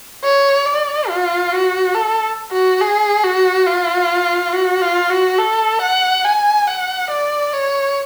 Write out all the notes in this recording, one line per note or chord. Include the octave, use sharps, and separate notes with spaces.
C#5
D5
F4
F#4
A4
F#4
G#4
F#4
F4
F#4
F4
F#4
A4
F#5
G#5
F#5
D5
C#5